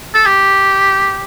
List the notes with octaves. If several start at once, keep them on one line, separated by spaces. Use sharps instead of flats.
A4
G4